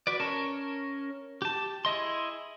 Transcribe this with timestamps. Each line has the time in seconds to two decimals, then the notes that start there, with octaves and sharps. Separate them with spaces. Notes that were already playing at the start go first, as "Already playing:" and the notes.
0.07 F#4 B4 D5
0.20 C#4 A#4 C#5 A5
1.42 G4 A5
1.85 E4 G#4 D#5 C6